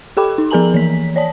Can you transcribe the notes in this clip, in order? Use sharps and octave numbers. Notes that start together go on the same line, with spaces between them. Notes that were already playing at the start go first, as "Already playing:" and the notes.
G4 A4 G5 B5 D6
D#4
F3 G#4 A#4 G#5 A#5 F#7
E3 B6
C#5 D5 A5